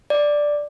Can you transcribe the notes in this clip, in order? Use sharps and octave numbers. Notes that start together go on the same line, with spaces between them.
D5